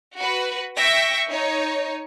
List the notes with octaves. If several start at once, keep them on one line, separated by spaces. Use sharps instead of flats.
F#4 B4
E5 G5 C#6 A#6
D#4 C#5